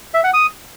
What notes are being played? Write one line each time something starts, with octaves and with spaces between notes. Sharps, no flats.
E5
F#5
D#6